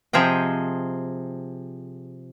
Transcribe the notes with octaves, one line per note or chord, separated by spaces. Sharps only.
C3 F3 G#4 D#5 G5